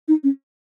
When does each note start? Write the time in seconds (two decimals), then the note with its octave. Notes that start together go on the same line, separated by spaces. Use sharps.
0.08 D#4
0.24 C#4